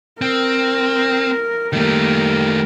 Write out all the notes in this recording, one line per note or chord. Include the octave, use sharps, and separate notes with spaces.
C4 A#4
D#3 G3 A3 A#3 A#4